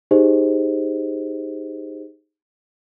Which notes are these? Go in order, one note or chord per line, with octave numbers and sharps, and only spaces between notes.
D#4 G4 G#4 C5 D#5